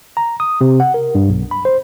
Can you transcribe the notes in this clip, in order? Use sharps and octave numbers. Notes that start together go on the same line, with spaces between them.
A#5
D#6
C3
F#5
A#4
G2
B1
B5
C5